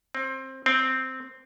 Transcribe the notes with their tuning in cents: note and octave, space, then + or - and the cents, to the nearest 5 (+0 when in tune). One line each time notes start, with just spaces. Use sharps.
C4 +20
C4 -5